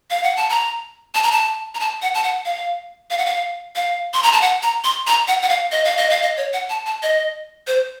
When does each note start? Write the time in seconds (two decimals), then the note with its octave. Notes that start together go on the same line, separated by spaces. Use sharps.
0.11 F5
0.23 F#5
0.37 A5
0.49 A#5
1.15 A5
1.23 A#5
1.32 A5
1.75 A#5
1.80 A5
2.02 F#5
2.14 A5
2.23 F#5
2.45 F5
3.11 F5
3.18 F#5
3.26 F5
3.76 F5
4.14 C6
4.23 A#5
4.33 A5
4.41 F#5
4.63 A#5
4.84 C6
5.07 A#5
5.28 F#5
5.42 F#5
5.49 F5
5.72 D#5
5.84 F5
5.97 D#5
6.10 F5
6.22 D#5
6.37 C#5
6.53 F#5
6.70 A5
6.86 A5
7.03 D#5
7.67 C5